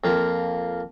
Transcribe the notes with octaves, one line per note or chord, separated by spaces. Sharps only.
F2 A#3 F4